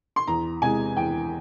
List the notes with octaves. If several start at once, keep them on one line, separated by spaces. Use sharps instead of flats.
C6
E2 A#5
C3 E3 G#3 G#5
E2 G5